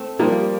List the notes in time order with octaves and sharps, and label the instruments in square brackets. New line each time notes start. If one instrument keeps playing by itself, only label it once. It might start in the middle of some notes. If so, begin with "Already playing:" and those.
Already playing: [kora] A3 C4
[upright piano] F3 [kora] G3 A#3